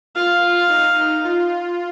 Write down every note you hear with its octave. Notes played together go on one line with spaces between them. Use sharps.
F4 F5
D#4
F4